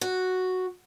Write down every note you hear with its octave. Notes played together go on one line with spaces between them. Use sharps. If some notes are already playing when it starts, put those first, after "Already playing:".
F#4